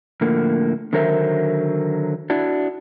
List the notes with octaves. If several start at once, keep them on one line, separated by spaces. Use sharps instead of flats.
A2 D3 F3 A#3
D3 D#3 F#3 A#4 C5 E5
D4 E4 F#4